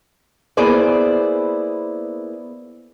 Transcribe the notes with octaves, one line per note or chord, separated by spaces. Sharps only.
A#3 B3 E4 G#4 C5 D5